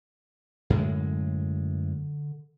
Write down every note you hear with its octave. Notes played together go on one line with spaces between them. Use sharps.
F#2 A2 D3 G#3